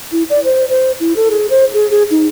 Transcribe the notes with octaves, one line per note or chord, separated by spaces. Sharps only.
E4
D5
C5
C5
E4
A4
G#4
C5
G#4
G#4
D#4